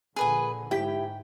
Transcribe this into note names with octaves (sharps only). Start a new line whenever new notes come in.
A#1 A#2 D3 G#4 B4 G#5
G#2 E4 G4 G5